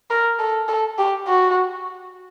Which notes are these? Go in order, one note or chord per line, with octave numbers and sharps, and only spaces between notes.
A#4
A4
A4
G4
F#4